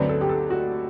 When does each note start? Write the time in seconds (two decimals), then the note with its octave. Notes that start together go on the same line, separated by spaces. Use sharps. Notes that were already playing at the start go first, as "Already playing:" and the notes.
Already playing: D2 D3 F#3 C4 B4
0.09 A4
0.21 G4
0.29 A4
0.50 F#4